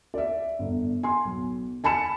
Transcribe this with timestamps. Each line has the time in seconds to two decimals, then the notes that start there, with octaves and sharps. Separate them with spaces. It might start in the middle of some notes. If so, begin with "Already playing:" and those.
0.14 D5 E5
0.59 G1
1.03 G#5 C6
1.25 B1
1.84 G#5 A5 B5 C#7 E7